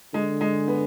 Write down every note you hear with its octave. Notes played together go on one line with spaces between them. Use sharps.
D3 G#3
G#3
B3